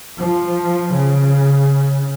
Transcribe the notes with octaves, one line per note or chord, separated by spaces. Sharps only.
F3
C#3